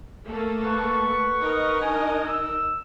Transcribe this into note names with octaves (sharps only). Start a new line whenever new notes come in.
A3 A#3 A4
B4 F#5 C#6
D#4 A#4 D#5
D4 F#4 G#5
E6